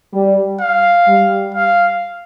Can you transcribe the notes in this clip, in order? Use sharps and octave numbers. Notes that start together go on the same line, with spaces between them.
G3
F5
G3
F5